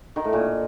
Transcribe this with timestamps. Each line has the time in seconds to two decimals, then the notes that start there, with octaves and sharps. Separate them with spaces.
0.16 D#3
0.24 A2
0.33 A#2